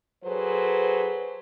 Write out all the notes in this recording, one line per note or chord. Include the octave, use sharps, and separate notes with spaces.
F#3 G#4 A4 B4 C5